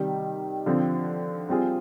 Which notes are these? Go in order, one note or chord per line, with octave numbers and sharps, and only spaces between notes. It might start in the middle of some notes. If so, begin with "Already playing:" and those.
Already playing: C3 D#3 G3
D3 F3 C4
G3 C4 F4 G#4